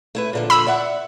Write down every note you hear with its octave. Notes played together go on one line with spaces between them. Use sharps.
A3 E4 B4
A#2 D3 F3
B5 E6
D5 E5 F#5